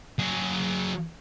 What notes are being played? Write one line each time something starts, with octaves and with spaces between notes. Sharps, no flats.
F#3 G#4